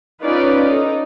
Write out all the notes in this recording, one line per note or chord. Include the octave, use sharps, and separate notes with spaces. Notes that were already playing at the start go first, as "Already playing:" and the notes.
C#4 D#4 F4 B4 D5
D#4 A4